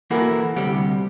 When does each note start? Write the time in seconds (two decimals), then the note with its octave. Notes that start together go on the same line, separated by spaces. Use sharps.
0.10 E3 A#3 E4 F#4 A4 A#4
0.56 D2 C3 G3 G4 F#5